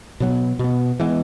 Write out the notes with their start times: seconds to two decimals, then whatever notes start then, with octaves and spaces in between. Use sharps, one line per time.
0.20 B2 F#3 B3
0.59 B2 B3
1.00 E3 G#3 B3